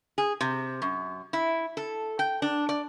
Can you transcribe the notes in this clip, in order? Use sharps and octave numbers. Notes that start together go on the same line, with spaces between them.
G#4
C3
F#2
E4
A4
G5
D4
D5